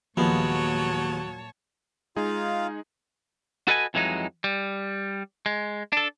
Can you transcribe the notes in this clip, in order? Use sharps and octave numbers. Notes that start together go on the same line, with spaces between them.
D#2 A#2 F3 F#3 G#3 B3 C#5 A5
G#3 D#4 F4 G#4 F5
F#4 A4 B4 D#5 F#5 G#5
F2 E3 F#3 G#3 D#4
G3
G#3
D4 A4